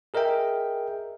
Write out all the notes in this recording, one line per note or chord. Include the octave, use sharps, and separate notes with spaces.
G#4 A#4 D#5 E5 G5